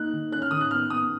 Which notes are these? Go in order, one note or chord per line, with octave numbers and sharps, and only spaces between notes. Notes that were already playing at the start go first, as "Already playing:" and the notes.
Already playing: A#3 D#4 F#6
D#3
C#4 F#6
F6
D#3 D#6
F#6
B3 F6
B3 D#6